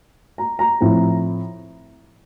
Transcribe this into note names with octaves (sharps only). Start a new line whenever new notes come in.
A#5
A#5
A2 F3 C4 E4